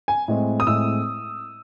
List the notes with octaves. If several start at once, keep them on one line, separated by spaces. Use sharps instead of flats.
G#5
A2 G#3 C4
D#6
A2 G#3 C4 E6